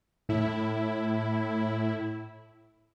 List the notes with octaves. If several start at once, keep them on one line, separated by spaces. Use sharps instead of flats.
A2 E4